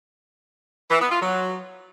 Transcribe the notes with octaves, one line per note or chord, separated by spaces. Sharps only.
E3
B3
F4
F#3